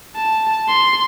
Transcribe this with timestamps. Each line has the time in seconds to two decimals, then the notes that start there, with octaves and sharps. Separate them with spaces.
0.15 A5
0.68 C6